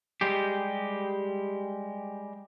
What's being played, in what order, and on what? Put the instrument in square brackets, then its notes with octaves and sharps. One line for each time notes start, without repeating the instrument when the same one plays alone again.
[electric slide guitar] G3 G#3 G4